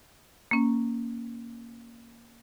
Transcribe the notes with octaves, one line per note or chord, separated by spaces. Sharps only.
A#3 C#4